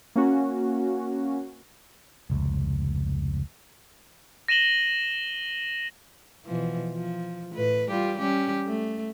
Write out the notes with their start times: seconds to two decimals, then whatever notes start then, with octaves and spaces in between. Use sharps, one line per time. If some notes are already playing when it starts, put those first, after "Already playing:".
0.16 A#3 C#4 F#4
2.30 F1 C#2
4.48 A#6 D#7 E7 F#7 G7
6.45 B2 E3 F3
6.93 F3
7.54 A2 B4
7.90 G3 F4 G4
8.19 G3 C#4 G4
8.67 A3